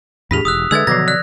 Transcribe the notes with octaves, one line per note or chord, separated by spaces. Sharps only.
E2 A2 D4 G4 G#4 B6 F7
E1 D#6 E6 F#6
D3 G#3 A4 B4 E5 E6 G#6 A6
B2 D3 D#3 F3 F#3 G#6 A#6
D5 F#6